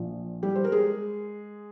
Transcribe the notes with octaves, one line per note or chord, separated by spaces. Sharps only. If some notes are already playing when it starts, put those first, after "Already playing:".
Already playing: A#1 A#2 F3
G3 G4
C5
A#4
G#3 G#4